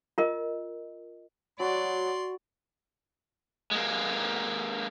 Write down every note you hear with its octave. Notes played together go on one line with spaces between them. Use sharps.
F4 A#4 D#5
F#3 F#4 D5 B5 C6
G#3 A#3